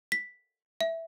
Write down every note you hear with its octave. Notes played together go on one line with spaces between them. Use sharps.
B6
E5